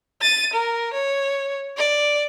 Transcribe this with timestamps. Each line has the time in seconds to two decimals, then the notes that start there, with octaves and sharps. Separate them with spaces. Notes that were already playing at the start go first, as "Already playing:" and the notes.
0.21 A6 D#7
0.53 A#4
0.93 C#5
1.77 D5